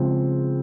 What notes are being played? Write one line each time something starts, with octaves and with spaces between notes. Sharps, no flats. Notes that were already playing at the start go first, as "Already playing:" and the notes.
Already playing: C#3 F3 G#3 C4